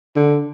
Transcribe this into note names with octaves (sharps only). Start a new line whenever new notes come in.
D3